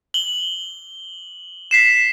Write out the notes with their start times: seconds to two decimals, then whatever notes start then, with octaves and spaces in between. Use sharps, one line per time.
0.14 F#7 G7
1.71 B6 C7 E7